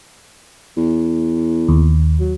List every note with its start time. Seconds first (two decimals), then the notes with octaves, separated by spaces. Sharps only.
0.77 E2
1.68 D#2
2.20 F#3